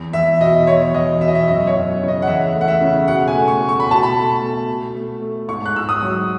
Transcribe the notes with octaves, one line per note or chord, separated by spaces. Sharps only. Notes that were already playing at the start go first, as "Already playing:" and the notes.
Already playing: E2
E2 E5
B2 D#5
E2 C#5
E2 D#5
B2 E5
D#5
E5
F#2 D#5
C#5
F#2
C#3 C#5
D#5
F#5
E2 E5
A3
F#5
E5
C#3
B2 F#5
G#5
A3
C#6
A3
C#6
B5
B2 A5
B5
A3
A3
B2
A3
A3
G#2 C#6
F#6
G#2 E6
D#6
F#3